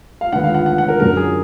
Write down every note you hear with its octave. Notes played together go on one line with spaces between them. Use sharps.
F5
D#2 D3 G#3 B3 F#5
F5
F#5
F#5
F#5
A#4
F#2 D3 F#3 A#4
G#4